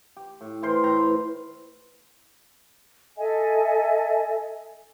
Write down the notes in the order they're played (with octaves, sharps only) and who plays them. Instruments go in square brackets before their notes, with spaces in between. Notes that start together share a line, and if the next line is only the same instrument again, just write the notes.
[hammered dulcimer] G4
A2
E3 A#4 C5 C6
A2 G5 A#5
B4
[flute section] A4 D#5 E5 G#5